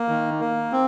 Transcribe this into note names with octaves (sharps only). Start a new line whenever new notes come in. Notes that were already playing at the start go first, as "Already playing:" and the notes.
Already playing: A#3
D#3
A#3
C4